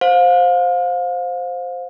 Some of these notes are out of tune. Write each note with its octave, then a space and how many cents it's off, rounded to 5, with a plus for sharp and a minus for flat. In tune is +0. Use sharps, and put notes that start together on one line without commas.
C5 +0 F5 +30